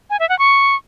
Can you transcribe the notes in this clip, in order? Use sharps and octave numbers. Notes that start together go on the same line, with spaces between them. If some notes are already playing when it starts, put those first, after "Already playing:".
G#5
E5
F#5
C#6